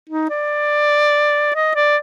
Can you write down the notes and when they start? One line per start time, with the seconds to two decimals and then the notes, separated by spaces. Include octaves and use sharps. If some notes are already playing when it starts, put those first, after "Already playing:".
0.09 D#4
0.30 D5
1.55 D#5
1.76 D5